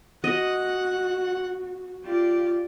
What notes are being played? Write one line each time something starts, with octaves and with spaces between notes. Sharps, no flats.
F#4 D#5 F#5
F4 G4 D5